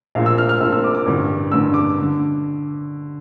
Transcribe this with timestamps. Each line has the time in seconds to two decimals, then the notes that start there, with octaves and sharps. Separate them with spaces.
0.15 A#1 A#2 F5
0.26 E6
0.38 F6
0.49 F6
0.60 A#1 E6
0.65 A#2
0.72 E6
0.84 D6
0.95 D6
1.06 A1 G2 D3
1.52 A1 G2 D3 E6
1.74 D6
2.01 D3